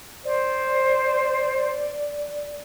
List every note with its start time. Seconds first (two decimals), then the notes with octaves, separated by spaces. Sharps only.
0.25 C5 D5